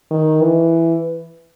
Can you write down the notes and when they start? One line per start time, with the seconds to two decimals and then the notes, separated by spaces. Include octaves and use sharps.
0.11 D#3
0.41 E3